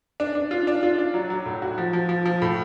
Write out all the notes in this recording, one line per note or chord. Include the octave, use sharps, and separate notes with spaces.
D4
D4
F4
D4
F4
D4
F#3
F#3
A2
F#4
F3
F3
F3
F3
A2